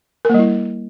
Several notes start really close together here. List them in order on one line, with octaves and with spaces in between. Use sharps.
A#4 A#3 G3 E4